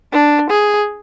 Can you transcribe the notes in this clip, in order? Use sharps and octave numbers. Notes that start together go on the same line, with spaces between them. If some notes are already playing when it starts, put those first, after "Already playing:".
D4
G#4